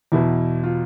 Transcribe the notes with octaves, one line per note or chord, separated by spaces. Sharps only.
E2 B2 E4
F4